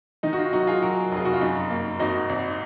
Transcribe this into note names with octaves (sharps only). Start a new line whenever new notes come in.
D#3 D#4
F#4
F4
F#3 D#4 F#4
F4 G#4
F#3 F#4 A#4
F1 G#4
F#4
F4
F#2 D#4
A#3
G#1 D#4 F#4
G#1